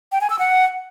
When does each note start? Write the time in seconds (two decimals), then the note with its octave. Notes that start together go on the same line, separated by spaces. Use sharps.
0.12 G5
0.21 G#5
0.30 E6
0.39 F#5